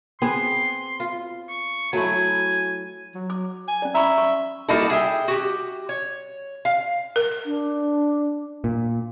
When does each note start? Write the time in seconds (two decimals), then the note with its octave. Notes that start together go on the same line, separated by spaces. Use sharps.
0.22 B3 C4 G#4 C6
1.00 F4
1.49 C#6
1.93 F#3 A3 E4 G#5
3.15 F#3
3.30 D6
3.68 G#5
3.82 C#4 D5
3.95 E5 A#5 B5 C#6
4.18 C#6
4.68 G3 A#3 D#4 E4 F#4 A4
4.90 G#4 E5 G5
5.28 F#4 G4
5.89 C#5
6.65 F5
7.16 A#4
7.45 D4
8.64 A#2